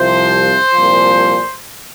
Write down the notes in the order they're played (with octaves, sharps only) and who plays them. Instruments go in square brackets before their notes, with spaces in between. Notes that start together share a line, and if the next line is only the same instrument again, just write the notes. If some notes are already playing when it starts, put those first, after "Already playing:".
Already playing: [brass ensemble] C2 C3 F3 C5
C2 A#2 F3